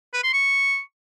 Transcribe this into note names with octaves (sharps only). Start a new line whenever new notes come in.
B4
C6
C#6